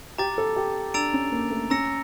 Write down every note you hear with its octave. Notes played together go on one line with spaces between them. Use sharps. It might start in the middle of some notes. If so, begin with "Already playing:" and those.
G4 A#5 D6 A6
A4
G4
D4 A#5 E6 A6 D7 F7
C#4
A#3
A3
C#4 A#5 E6 A#6 C#7